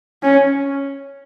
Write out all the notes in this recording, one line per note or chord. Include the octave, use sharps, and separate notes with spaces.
C#4